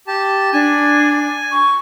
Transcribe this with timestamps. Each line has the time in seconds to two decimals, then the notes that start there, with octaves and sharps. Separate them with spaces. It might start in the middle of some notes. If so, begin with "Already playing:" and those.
0.07 G4 A5
0.53 D4 G#5
1.52 C#6